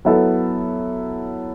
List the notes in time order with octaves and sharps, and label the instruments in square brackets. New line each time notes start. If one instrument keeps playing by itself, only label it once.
[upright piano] F#3 B3 E4 A4